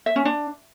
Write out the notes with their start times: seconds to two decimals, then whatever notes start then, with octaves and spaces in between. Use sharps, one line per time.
0.06 E5
0.16 C#4
0.25 D4